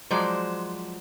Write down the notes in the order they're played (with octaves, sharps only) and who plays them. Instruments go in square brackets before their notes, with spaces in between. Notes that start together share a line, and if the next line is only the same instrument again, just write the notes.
[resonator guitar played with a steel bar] F3 F#3 G#3 C5 D5